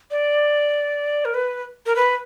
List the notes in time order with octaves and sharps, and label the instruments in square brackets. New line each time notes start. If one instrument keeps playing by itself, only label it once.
[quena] D5
A#4
B4
A#4
B4